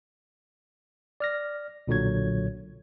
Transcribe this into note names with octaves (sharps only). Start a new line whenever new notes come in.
D5 F6 A#6
B1 A#2 D3 F#3 C#5 G#6